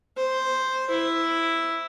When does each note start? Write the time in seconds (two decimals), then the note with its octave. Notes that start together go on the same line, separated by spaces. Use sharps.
0.17 C5
0.90 E4